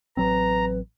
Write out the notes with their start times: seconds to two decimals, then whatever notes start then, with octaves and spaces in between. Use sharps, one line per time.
0.17 A1 F#3 C4 B4 A#5